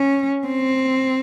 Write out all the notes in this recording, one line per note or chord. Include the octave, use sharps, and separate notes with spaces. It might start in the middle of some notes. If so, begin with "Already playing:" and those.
Already playing: C#4
C4